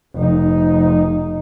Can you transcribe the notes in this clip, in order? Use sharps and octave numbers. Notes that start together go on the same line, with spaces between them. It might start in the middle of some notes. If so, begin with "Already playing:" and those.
F1 D#4